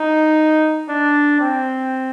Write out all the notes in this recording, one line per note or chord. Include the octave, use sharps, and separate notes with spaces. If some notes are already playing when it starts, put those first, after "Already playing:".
Already playing: D#4
D4
C4